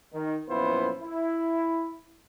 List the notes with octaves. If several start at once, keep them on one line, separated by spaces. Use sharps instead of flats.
D#3
F#2 A#2 F3 B3 E4 C5
E4